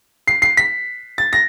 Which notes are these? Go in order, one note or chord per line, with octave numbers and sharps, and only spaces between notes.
C7
C7
B6
A6
A#6